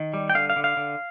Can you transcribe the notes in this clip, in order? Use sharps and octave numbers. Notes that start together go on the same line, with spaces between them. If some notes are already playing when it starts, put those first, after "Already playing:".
Already playing: D#3
G3
G5
D3 F5
F5
D3
F5
D3